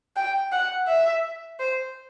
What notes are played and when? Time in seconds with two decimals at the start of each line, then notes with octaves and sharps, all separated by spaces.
0.16 G5
0.52 F#5
0.88 E5
1.59 C5